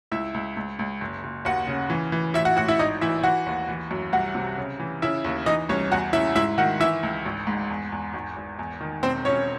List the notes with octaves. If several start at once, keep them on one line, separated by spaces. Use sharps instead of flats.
C#2 E4 E5
C#2
C#2
C#2
F#1
F#1
D#2 F#4 F#5
C#3
E3
E3
A1 E4 E5
F#4 F#5
A1 F#4 F#5
E4 E5
G#1 D#4 D#5
E3 E4 E5
E3 F#4 F#5
D#2
E3
F#2
C2 F#4 F#5
C3
C#3
E3
C#3 E4 E5
D#2
E3 D#4 D#5
C2 C#4 C#5
E2 F#4 F#5
C#3 E4 E5
G#2 E4 E5
D#3 F#4 F#5
E3 E4 E5
C#2
G#1
G#2
E2
E2
G#1
G#1
E2
D#3
E1 C4 C5
E1 C#4 C#5